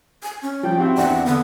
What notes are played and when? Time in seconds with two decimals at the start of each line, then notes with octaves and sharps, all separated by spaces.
0.23 G#5
0.42 C#4
0.63 F3 G3 G5
0.78 C4 E4 F#4 G4
0.97 E2 D4 E5 F#5
1.26 D3 B3